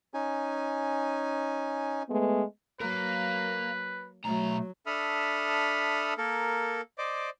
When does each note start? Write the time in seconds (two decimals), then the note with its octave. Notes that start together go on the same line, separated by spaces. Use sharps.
0.14 C#4 D#4 G#5
2.09 G#3 A3 B3
2.81 F#3 A#3 A#4 B4 F5
4.25 B1 F#3 A3 A#5
4.86 D4 A4 E5 B5 D#6 F6
6.18 A#3 A4 A#4
6.98 C5 D5 D#5 D6